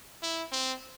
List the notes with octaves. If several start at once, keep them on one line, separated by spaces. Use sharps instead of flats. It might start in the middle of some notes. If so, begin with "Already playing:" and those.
E4
C4